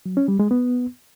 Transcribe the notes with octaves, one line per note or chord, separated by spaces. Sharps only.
F#3
C#4
G3
G#3
B3